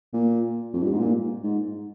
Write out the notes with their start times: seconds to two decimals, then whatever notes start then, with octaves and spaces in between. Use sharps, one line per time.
0.13 A#2
0.73 F2
0.83 G2
0.92 G#2
1.00 A#2
1.44 G#2